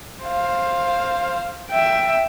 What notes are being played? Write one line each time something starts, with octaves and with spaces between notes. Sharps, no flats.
C5 F5
E5 G5